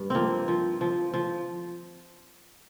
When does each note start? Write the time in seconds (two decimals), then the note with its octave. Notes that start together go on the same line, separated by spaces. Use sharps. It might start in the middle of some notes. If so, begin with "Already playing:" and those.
Already playing: G2
0.10 F3 A#3 C4
0.48 F3
0.81 F3
1.14 F3